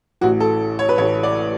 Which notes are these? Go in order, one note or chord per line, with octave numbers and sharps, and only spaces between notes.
A1 A2 E3 F#4
A4
C#5
B4
A1 A2 E3 C#5
D5